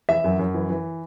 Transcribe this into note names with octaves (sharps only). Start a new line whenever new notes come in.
E3 E5
F#2
F#2
E3
E3